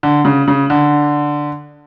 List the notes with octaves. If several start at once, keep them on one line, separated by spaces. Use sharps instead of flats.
D3
C#3
C#3
D3